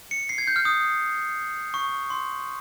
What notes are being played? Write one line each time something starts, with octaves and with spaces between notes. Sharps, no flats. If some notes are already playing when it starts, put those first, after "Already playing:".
C#7
C7
G#6
G6
F6
D#6
C#6
C6